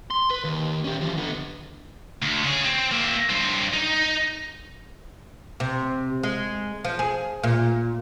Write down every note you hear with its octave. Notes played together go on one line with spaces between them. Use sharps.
C6
B4
D#2
C#4 G4
E3 F4
D3 B3
D2
C#3 G#4
C4
A#3 E5
G2 C4
D#4
C3
G#3
F3
G#4
A#2